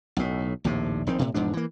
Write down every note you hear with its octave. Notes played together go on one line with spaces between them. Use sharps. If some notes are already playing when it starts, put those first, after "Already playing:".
B1 A2
A#1 D#2 A2 C3
A#1 D#3 C4
A2 C3
E1 G#2 F3 D4
E3 A#3